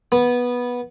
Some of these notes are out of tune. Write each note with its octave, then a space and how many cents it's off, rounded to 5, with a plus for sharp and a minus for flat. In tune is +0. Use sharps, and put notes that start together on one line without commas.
B3 -10